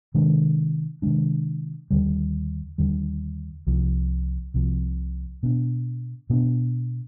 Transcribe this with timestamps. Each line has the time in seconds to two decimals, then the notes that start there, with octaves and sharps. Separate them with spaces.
0.14 C3 D#3 G#3 D4
1.02 C3 D#3 G#3 D4
1.91 D#2 D3 G3
2.78 D#2 D3 G3
3.67 C2 C3 F3
4.54 C2 C3 F3
5.43 B2 B3 D4
6.30 B2 B3 D4